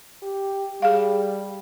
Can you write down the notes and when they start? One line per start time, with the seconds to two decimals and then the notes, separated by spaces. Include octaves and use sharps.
0.23 G4
0.82 G3 G#4 F5